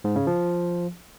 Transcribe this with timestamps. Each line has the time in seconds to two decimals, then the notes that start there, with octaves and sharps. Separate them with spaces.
0.04 G#2
0.16 C#3
0.27 F3